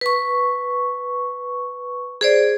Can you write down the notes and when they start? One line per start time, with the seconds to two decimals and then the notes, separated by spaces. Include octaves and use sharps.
0.01 B4 C#6
2.21 G#4 C5 D5